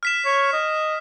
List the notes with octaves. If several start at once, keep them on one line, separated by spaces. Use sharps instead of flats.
F6 B6 E7
C#5
D#5